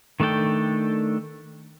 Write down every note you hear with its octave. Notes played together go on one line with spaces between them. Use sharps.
D#3 A3 D4 A4 G5